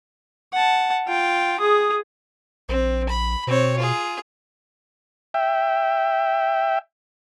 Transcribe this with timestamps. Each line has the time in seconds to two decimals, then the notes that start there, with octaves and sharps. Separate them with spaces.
0.53 F#5 A5
1.07 F4 G5
1.60 G#4 D#6
2.69 A#1 C4
3.09 B5
3.47 B2 C4 C#5
3.78 F4 G#4
5.34 E5 G5